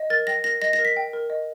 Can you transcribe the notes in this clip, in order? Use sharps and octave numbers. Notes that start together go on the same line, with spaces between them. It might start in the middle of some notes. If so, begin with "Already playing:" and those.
Already playing: D#5
A#4 A6
G5 A#6
A#4 A#6
D#5 A#6
A#6
A#4
B6
G5
A#4
D#5